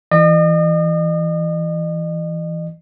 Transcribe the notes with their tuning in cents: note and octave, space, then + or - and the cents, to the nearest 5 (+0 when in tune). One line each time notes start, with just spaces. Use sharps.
E3 +5 D#5 -40